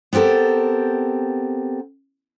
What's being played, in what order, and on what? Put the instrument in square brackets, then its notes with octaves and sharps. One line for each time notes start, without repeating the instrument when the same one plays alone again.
[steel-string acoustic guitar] B3 C4 G4 A4 A#4